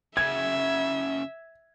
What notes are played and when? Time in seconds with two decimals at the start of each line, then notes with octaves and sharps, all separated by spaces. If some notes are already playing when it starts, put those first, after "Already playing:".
0.17 F#2 C#3 E5 G#6